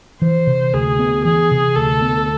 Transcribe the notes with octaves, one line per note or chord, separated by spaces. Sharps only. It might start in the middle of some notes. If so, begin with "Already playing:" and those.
E3 C5
C3
D2 G#4
B3
E3 G#4
C3
D2 A4
B3